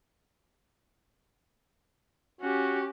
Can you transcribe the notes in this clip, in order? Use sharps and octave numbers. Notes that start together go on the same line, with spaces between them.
C#4 F#4 G4